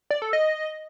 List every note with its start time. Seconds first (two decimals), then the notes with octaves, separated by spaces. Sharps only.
0.10 D5
0.22 A4
0.33 D#5